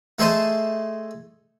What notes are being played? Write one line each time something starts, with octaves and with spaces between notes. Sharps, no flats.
A3 G#4 A4 C5 D#5 A5